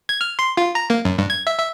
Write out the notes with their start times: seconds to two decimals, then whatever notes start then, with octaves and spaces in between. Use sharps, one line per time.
0.09 G#6
0.21 F6
0.39 C6
0.57 F4
0.75 A#5
0.90 A#3
1.05 F#2
1.18 G2
1.30 G#6
1.47 E5
1.59 E5